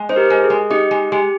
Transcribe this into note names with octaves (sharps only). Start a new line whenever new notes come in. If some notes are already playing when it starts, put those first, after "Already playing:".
Already playing: G#3
D#4 C5
G4 A#4
G#3
G#4
G#3
D#4 G4
G#3
G#3 G4